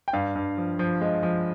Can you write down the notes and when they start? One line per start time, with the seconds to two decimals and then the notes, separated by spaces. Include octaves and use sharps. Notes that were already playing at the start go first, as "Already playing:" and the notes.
0.08 G5
0.13 G2 F5
0.35 G2
0.58 F3
0.79 F3
1.01 G#3
1.23 F3